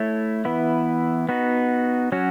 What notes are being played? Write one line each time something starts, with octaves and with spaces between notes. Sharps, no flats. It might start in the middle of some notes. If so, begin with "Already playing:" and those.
Already playing: A3 E4 A4 C#5
E3 B3 E4
B3 D#4 F#4
F#3 C#4 F#4